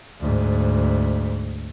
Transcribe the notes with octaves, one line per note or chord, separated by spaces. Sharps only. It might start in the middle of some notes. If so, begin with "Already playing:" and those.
D2 G#2